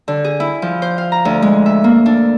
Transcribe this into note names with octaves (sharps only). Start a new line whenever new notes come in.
D3
G#4
E4
F3
C5
F5
A#5
D2
G#3
E5
A#3
D4